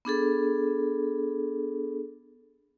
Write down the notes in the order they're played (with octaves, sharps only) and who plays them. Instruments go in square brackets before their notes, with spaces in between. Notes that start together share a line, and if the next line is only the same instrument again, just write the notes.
[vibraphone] B3 D4 G#4 A4